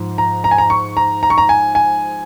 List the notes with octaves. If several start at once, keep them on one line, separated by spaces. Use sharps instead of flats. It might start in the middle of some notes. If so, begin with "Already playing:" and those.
Already playing: G#2 F3
A#5
A#5
G#5
A#5
C#6
A#5
A#5
C#6
A#5
G#5
G#5